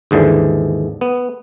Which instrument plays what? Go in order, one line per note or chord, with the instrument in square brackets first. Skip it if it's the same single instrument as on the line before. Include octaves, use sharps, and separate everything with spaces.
[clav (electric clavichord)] D#2 G#2 D3 E3
B3